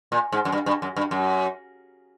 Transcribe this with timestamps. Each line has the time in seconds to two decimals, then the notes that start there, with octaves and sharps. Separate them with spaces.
0.12 A#2
0.32 G#2
0.45 F#2
0.52 G2
0.66 G2
0.82 F#2
0.96 G2
1.11 F#2